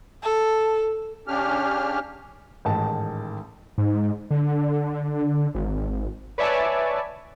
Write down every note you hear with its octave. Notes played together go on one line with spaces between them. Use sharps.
A4
C#3 C#4 D4 G4 F6
A1 G#2 D#3 A5
G#2
D3
G#1
B4 C#5 D5 E5 G#5 A5